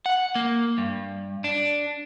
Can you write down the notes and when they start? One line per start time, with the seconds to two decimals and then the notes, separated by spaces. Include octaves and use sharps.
0.06 F#5
0.35 A#3
0.78 G2
1.44 D4